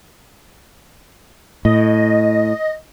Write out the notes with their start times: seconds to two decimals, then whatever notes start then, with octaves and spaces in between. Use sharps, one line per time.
1.65 A2 D#5